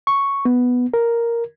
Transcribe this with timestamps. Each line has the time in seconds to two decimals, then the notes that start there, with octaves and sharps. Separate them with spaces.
0.07 C#6
0.45 B3
0.94 A#4